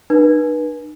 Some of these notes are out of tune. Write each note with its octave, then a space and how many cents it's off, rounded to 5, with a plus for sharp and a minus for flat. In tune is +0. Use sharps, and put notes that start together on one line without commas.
D#4 -45 B4 -30